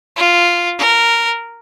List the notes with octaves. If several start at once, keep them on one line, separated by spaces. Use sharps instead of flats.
F4
A#4